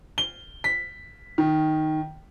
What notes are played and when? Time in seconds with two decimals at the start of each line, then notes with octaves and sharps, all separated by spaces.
0.18 G7
0.64 B6
1.38 D#3